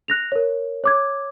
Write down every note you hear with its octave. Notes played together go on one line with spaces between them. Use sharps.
F#6 A#6 F7
A#4 C#5
C#5 D6 G#6